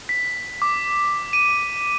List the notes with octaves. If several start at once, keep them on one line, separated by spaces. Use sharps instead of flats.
B6
D6
D#7